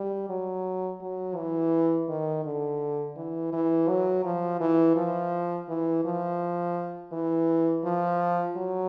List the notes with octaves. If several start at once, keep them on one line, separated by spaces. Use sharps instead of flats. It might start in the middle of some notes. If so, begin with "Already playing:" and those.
Already playing: G3
F#3
F#3
E3
D#3
D3
E3
E3
F#3
F3
E3
F3
E3
F3
E3
F3
F#3